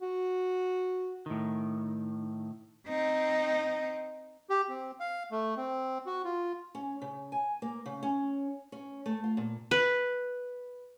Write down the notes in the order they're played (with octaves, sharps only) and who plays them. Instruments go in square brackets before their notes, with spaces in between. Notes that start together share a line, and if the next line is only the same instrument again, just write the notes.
[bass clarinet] F#4
[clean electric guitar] A2 D#3
[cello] C4 D#4
[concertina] G4
C4
F5
A3
C4
F#4
F4
[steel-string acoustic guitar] C#4
C#3
G#5
A#3
C#3
C#4
C#4
A3
F4
A#2
[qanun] B4